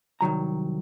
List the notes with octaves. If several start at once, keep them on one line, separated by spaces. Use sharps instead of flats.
C2 D#3 F#3 A#5